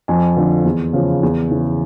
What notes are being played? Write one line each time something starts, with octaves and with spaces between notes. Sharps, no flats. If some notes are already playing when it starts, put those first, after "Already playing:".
F2 G#5
D3 F3
E2
C#3 F3
E2
C#3 E3